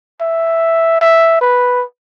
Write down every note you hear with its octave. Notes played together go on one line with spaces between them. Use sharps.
E5
E5
B4